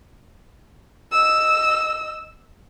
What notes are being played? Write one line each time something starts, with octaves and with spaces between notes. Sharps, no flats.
D#5 E6